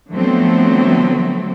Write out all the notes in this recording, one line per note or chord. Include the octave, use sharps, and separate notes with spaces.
D3 F3 F#3 A3 B3 C4